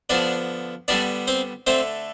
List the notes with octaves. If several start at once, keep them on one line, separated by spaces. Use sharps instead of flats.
D3 F3 B3 D4 D5
D3 G3 B3 D4 D5
C4 C5
D3 A3 C4 C5